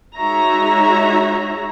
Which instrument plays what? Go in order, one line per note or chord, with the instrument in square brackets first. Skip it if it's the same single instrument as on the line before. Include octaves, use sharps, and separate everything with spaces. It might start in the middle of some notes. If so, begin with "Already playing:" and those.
[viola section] G#3 D#4 F#4 C#5 E5 A#5